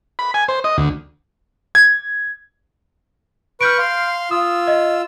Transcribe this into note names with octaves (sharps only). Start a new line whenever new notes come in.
B5
G#5
C5
D#5
D2
G#6
B4 C#6 F6 G6 D7
F5 C6
F4 D#6 E6
D#5